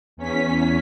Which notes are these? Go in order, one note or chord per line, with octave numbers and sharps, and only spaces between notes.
E2 C#4 B6